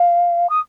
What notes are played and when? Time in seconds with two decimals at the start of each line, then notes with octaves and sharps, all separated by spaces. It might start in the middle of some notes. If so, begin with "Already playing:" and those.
Already playing: F5
0.49 D#6